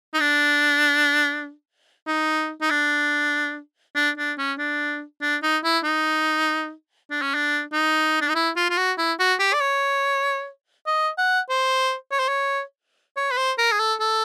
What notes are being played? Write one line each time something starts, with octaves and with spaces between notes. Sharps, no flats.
D#4
D4
D#4
D#4
D4
D4
D4
C#4
D4
D4
D#4
E4
D#4
D4
C#4
D4
D#4
D4
D#4
E4
F4
F4
F#4
E4
F#4
G4
D5
C#5
D#5
F#5
C5
C#5
C5
C#5
C#5
B4
C5
A#4
G#4
A4
A4